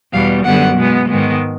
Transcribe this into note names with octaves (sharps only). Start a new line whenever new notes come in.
E2 B2 G3 F5
F#2 D3 G3 B3 F#5
B2 G#3 B3
G#2 D#3 G#3 B3